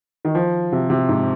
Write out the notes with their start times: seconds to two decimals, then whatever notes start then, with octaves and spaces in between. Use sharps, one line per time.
0.25 D#3
0.35 F3
0.72 C3
0.90 C3
1.09 G#2